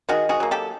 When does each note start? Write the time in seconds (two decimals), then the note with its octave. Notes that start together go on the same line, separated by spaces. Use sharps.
0.09 D#3 F#4 G#4
0.29 F#4 G#4
0.40 F#3 A#3
0.51 G4 A4